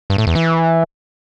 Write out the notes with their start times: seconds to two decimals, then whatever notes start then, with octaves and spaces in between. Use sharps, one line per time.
0.10 G2
0.18 A2
0.27 E2
0.35 E3